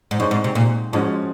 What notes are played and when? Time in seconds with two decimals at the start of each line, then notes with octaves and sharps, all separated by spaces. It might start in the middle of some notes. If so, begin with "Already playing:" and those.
0.11 G#2
0.19 F#2 G#3 C4 D#4
0.31 G#2
0.44 C3
0.55 A#2
0.92 G#2 F3 G#3 C#4 F#4